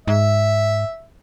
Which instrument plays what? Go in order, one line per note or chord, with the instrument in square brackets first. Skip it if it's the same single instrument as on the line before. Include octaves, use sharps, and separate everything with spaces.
[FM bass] G#2 [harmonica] E5